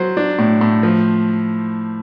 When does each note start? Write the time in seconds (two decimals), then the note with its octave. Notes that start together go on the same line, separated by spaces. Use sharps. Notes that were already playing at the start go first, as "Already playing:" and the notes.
Already playing: F#3 C5
0.17 D4
0.39 A2
0.61 A2
0.83 F3